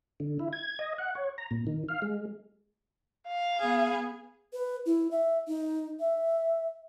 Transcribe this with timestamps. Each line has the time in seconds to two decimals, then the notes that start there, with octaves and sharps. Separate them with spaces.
0.20 D3
0.39 E4
0.53 G#6
0.79 D#5
0.98 F#5
1.15 C#5
1.38 A#5
1.51 A#2
1.67 D#3
1.89 F5
2.02 G#3
3.28 F5
3.59 B3 G#4
4.53 B4
4.86 E4
5.11 E5
5.48 D#4
6.00 E5